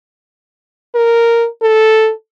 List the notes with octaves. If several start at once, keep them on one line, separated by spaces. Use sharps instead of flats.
A#4
A4